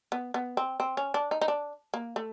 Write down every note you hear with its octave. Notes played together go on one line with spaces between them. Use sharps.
B3
B3
C4
C4
C#4
D4
D#4
D#4
D4
A#3
A3